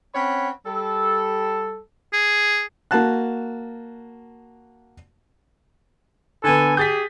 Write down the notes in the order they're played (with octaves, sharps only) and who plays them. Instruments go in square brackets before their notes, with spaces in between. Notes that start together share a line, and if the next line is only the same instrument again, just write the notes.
[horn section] C4 C#4 C#5 F#5 B5
G3 A4
[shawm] G#4
[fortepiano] A#3 F#4 A5 F#6
[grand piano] D3 B3 [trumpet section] A4 G#5
[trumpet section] G4 G#4 [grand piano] G6 A6 B6